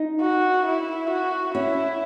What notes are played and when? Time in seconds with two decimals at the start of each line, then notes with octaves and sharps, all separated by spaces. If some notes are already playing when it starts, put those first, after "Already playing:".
Already playing: D#4
0.21 F#4
0.66 E4
1.10 F#4
1.55 C#4 E4